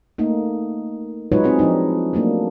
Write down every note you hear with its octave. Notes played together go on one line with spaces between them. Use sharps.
A3 A#3 D#4
F#3 G#3 D#4 F4 B4 C#5
C4 D#4 G#4
F3 D4 D#4
F#3 A3 A#3 D4